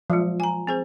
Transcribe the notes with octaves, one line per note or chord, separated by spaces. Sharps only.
F3 F#3 G#3
G#5 A#5
C4 G#4 C5